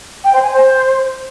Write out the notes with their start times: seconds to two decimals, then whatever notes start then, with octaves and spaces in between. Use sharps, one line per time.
0.24 G5
0.33 C5
0.42 G#5
0.52 C5